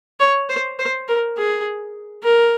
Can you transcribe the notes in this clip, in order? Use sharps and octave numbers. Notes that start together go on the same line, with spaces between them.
C#5
C5
C5
A#4
G#4
A#4